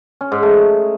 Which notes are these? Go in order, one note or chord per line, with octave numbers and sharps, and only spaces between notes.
C#4
G#2
A3